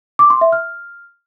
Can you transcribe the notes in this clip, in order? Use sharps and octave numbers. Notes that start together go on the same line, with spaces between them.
D6
C6
E5
F6